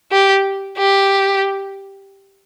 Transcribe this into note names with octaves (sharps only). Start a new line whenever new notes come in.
G4
G4